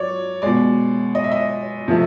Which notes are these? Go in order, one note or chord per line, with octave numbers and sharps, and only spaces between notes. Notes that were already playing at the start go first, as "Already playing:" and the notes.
Already playing: F#3 C#5 D5
B2 G#3 D5
D#5
E5
D#5
C3 F3 A3